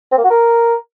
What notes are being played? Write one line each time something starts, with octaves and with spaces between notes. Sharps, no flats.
C4
A#3
F#4
A#4